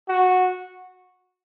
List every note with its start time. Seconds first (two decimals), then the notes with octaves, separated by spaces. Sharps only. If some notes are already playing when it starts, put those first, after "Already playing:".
0.09 F#4